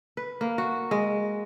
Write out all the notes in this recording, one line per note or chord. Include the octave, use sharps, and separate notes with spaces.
B4
A#3
F#4
G#3